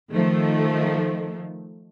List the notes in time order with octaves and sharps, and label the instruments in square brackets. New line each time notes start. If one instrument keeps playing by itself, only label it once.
[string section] D#3 F3 A3